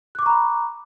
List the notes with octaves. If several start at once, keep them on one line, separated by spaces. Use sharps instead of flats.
A#5 B5 C#6 D6 F#6